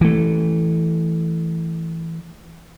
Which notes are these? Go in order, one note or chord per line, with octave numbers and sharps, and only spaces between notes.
E3 A3